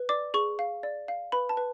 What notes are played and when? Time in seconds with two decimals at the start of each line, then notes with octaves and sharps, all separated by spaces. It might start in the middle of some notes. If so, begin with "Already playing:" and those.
Already playing: B4
0.09 D5 D6
0.34 G#4 C#6
0.59 F5
0.83 D5
1.08 F5
1.32 B4 B5
1.49 A5
1.57 B4